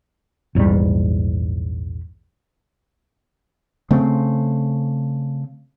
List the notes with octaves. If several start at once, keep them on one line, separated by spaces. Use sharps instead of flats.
A#1 E2 G#2 G3
C#3 A3 C4